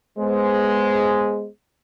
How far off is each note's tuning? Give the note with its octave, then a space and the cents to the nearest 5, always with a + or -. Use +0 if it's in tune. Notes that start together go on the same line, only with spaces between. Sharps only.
G#3 +0 B3 +0 C5 +5